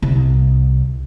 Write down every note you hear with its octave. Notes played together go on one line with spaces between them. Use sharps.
C2